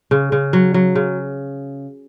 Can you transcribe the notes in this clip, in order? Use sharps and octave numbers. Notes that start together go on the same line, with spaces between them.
C#3
C#3
F#3
F#3
C#3